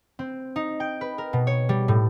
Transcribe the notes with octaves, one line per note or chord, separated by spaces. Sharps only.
C4
D#4
G5
B4
A#4
B2
C#5
G3
A2